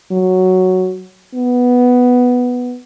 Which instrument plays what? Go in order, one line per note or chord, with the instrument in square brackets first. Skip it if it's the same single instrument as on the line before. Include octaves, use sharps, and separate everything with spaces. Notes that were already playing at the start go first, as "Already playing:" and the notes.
[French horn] F#3
B3